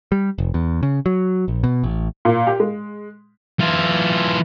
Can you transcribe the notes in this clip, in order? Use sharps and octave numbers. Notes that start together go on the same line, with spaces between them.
G3
F1
E2
C#3
F#3
A#1
B2
A1
A#2
G4
G#3
E3 F4